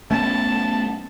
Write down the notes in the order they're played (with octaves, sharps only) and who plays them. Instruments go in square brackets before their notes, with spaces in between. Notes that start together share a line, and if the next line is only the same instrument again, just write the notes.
[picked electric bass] A3 B3 C#4 [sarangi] A5